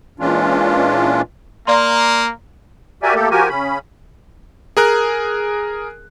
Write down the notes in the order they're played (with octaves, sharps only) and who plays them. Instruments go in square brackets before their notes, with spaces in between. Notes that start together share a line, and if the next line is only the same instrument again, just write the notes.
[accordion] A#2 E3 G#3 C#4 D4 F4
[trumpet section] A#3 [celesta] D5 A#5 C6
[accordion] F#4 G4 A#4 D5 E5 G#5
A3 A#3 G4 A4
F3 F#4 G4 A#4 G#5
C#3 C#4 B5
[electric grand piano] G#4 A#4 F#6